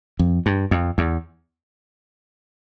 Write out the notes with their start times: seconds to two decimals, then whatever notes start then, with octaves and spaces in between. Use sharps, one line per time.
0.19 F2
0.46 G2
0.71 F2
0.98 E2